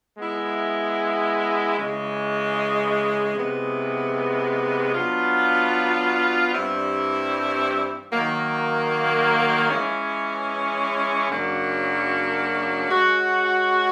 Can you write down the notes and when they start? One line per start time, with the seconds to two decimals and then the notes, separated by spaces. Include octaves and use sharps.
0.18 G#3 B3 E4
1.77 C#3 E3 G#3
3.35 C3 E3 G#3 B3
4.94 F#3 B3 D4 F4
6.53 G2 E3 G3 C4 E4
8.12 D#3 F#3 A#3
9.70 E3 G#3 C#4
11.30 F#2 C#3 F#3 A#3 D4
12.87 G#3 C#4 F#4